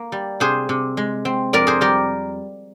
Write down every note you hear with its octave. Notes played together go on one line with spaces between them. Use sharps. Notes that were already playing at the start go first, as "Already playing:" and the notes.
Already playing: A#3
G3
C3 G#4 C5
C3
G#3
C4
F2 A#4 D5
G#4 C5
G3 G4 A#4